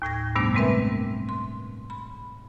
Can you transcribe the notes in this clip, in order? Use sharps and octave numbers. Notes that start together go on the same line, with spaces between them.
D#2 A2 G#6 A#6
G2 C3 G3 A3 B3 D4
G3 G#3 C4 A#4 B4 E5
C6
B5